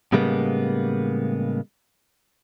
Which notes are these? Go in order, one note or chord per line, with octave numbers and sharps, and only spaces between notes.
A2 C#3 G3 G#3 A#3 B3